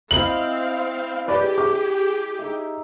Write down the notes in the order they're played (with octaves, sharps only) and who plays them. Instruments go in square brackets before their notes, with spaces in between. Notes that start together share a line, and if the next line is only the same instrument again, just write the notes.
[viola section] C4 F5 [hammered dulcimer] E4 D#5 B5 [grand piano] F#7
[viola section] G4 G#4 [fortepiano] B4 D5
[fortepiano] D6
[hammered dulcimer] D#4 E5